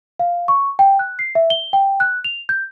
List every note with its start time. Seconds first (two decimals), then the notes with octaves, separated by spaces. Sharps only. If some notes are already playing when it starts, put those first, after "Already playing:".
0.19 F5
0.48 C#6
0.79 G5
0.99 F#6
1.19 C7
1.35 E5
1.50 G7
1.73 G5
2.00 F#6
2.24 F7
2.49 G6